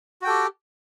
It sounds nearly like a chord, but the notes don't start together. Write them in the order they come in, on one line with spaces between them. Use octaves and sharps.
F#4 G5 A4 G4